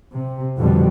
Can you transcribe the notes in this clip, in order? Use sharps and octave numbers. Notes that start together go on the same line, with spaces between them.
C3
F2 B2 D3 G3